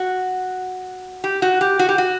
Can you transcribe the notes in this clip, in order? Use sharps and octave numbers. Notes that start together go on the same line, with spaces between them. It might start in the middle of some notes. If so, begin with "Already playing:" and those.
Already playing: F#4
G4
F#4
G4
F#4
G4
F#4